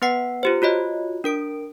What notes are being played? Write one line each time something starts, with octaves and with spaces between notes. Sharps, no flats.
B3 B4 F#5 C7
F4 G4 C5
F4 F#4 C#5 D#5
D4 A#4 D7